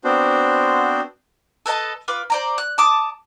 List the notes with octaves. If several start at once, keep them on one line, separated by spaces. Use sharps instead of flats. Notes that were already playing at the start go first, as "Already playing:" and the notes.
B3 C4 D4 F#4 C5
A4 B4 D#5 A5
F4 B4 D6
C5 D5 A#5
F#6
A5 D6 D#6